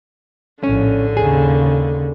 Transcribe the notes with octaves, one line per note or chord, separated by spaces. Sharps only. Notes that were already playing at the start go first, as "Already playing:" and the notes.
A#1 A2 D3 C#4
D#2 C#3 G#4